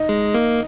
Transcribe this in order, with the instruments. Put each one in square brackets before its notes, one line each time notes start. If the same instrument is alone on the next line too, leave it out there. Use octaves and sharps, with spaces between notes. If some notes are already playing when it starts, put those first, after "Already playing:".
Already playing: [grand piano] D#4
[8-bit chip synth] G#3
A#3